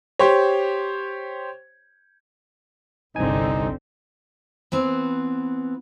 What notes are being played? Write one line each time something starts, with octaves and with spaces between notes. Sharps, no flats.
G4 C5 C#5
G1 C2 D3 C4 D#4 G#5
E3 B3 C4